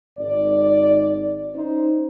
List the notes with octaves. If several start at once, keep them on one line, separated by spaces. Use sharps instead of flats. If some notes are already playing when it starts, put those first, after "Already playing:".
G#1 D5
C#4 D#4 C5